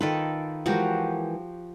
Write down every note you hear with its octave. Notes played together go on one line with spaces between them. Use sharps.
D#3 F4 A4 B4
E3 F3 G#3 F#4 G4 A#4